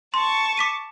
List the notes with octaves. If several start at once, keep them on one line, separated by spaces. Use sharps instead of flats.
A5 C6 C#6
D6 B6 D#7